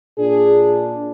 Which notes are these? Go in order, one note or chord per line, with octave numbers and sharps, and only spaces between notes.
A#2 D4 G#4